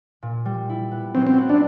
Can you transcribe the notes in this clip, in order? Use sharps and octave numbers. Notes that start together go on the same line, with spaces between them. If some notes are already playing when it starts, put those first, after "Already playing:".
A#2
G3
E4
B3
F#3 C4
C4
B3
D4